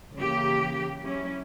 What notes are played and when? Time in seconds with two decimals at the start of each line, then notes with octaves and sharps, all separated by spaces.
0.15 C#3 E3 A#3 G4
1.03 F#3 C#4 E4